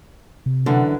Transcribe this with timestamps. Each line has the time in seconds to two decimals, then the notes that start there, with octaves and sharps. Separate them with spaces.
0.46 C3
0.66 F#2 D3 E3